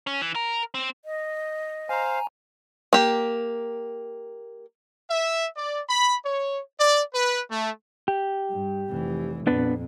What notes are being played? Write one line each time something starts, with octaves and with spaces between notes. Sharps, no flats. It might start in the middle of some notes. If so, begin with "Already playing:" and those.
C#4
E3
A#4
C4
D#5
C5 F5 G#5 A#5
A#3 G4
E5
D5
B5
C#5
D5
B4
A3
G4
G2
F1 E3
F2 A#2 B3 D4 B4